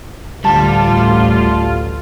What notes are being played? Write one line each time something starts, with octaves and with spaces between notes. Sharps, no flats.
A1 D2 G3 A3 F4 A5